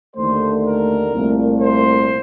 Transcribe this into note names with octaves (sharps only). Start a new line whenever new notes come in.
D#2 D3 A3 C5
A#4
C2 A#2 A3
C5